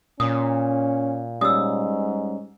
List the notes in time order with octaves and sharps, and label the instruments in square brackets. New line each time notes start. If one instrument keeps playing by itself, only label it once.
[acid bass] A#2 [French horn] C#4 [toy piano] D#6
[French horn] G#2 [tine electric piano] G3 C#4 [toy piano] D#6 E6